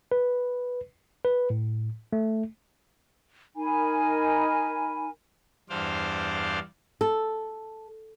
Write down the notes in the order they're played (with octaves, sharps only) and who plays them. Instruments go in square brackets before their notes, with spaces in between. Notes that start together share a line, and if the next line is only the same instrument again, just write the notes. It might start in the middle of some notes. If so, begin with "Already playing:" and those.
[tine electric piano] B4
B4
A2
A3
[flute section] D#4 A#4 G#5 B5
[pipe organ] E2 G2 D4 C5 D5 F5
[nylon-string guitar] A4